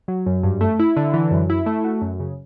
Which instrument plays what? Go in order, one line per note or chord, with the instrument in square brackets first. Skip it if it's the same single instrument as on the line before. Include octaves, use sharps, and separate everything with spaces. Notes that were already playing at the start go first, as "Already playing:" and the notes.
[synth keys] F#3
F#2
G2
A3
E4
D3
E3
F#2
E4
A3
F#4
F#2
C#3